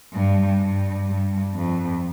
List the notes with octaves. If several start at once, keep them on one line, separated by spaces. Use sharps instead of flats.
G2
G2
G2
F2